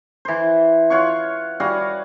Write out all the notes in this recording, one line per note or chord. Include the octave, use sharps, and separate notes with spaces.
E3 C5
F4 C#5 F#5 C#6
G3 F#4 F5 G#5